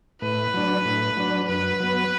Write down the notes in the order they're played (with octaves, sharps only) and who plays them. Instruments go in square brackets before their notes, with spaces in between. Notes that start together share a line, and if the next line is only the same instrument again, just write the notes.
[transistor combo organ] A2 [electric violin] B4
[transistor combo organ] F#3 D4
A2
F#3 D4
[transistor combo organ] F#2 [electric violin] B4
[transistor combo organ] F#3 B3